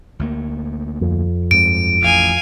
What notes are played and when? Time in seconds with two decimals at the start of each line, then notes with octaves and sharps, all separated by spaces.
0.19 D2 A3 A#3
1.01 F2
1.51 G2 G#3 C4 D7
2.02 A1 F5 G#5